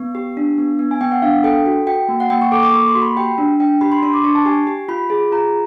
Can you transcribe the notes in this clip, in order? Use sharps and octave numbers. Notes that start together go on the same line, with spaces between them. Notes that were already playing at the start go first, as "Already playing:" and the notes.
Already playing: B3
G4
D4
B3
B3
G#5
B3 G5
F#5
D4 F5
A4 G5
F#4
F#4 G5
A#3
F#5
A#3 G5
C#6
A4 D6
D6
A#3 C#6
C6
F#4
B5
G4 G5
D4
D4 G5
G4 B5
C6
D4 C6
D6
D4 C#6
A5
G4 G#5
G4
F4 B5
G#4
F4 A#5